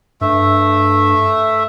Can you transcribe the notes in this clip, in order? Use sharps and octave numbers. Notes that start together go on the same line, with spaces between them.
G2 A3 E5